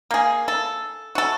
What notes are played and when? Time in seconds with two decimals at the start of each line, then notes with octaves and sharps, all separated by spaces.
0.11 A#3 G#4
0.48 A4
1.15 F#4 A4